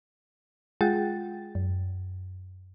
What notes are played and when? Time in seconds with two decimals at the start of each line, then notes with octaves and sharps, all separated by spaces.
0.81 G#3 F4 G#4 F#5 G5 A6
1.55 F#2